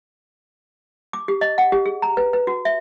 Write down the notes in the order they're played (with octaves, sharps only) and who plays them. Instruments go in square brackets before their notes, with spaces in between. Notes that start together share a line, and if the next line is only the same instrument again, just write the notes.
[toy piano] D6
G4
D#5
F#5
G4
G#4
A#5
B4
B4
F#4
E5